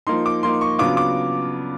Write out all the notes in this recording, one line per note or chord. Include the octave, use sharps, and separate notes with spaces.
F3 A#3 D#4 C6
D6
F3 A#3 D#4 C6
C#6
C#3 F#3 B3 D4 F4 D6
D6